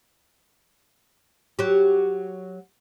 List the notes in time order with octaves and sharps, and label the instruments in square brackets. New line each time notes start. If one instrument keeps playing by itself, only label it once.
[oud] F#3 G4